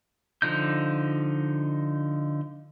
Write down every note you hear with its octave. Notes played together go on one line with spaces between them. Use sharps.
D3 F3 D#4 G6